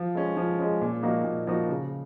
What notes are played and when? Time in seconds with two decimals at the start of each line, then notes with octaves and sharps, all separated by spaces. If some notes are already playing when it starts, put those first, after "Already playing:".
Already playing: F3
0.15 G#3 C#4
0.37 F3
0.59 G#3 C#4
0.81 A#2
1.03 F3 A#3 D#4 F#4
1.25 A#2
1.47 F3 A#3 D#4 F#4
1.69 C#3